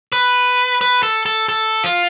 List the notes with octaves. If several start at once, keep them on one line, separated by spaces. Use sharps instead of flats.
B4
B4
A4
A4
A4
F4